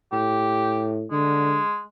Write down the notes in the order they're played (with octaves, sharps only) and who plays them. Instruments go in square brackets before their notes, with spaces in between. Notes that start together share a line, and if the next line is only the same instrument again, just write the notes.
[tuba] A2 [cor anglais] G4
[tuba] D3 [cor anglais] G#3